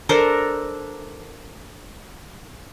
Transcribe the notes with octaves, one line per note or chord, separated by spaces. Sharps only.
D4 A4 A#4 C5